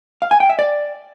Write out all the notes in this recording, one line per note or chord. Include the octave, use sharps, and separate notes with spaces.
F5
G#5
G5
E5
D5